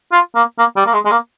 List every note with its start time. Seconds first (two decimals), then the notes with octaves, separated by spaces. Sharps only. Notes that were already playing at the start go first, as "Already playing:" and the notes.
0.12 F4
0.35 A#3
0.59 A#3
0.77 G3
0.87 A#3
0.93 G#3
1.05 G#3
1.11 A#3